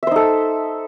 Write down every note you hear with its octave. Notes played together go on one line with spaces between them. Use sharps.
D#4 A4 C5 E5